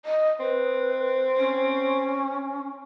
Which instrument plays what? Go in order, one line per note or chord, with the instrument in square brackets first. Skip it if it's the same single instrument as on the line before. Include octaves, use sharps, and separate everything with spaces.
[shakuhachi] D#5
[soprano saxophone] C4 [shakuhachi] B4
[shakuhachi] C#4